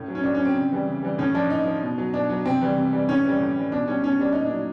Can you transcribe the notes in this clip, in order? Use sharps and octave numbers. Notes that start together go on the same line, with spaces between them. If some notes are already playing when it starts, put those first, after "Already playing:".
Already playing: A2 C#4
F#3
C#4
A2 D4
C#4
F#3 C4
C#3
E3 G3
C#3
E3 G3
A2 C#4
F3 D4
A2 D#4
F3
B2
F#3
B2 D4
F#3
C3 C4
E3 G3
C3
E3 G3
A2 C#4
E3 G3
A2
E3 G3
B2 D4
G3 C#4
B2 C#4
G3 D4
A#2 D#4
D4
F#3